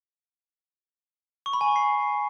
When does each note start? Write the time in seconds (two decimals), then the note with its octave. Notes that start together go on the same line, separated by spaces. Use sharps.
1.46 C#6
1.53 B5
1.61 G#5
1.68 C#6
1.76 C7